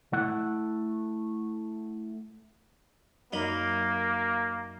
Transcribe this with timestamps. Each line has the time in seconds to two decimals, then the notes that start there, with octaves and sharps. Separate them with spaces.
0.13 A3 E4 F#5
3.33 F#2 A#3 D#4 B5